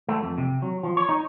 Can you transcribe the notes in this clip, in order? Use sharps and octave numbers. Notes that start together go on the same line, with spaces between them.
A3
F2
C3
F#3
F3
C#5
D#4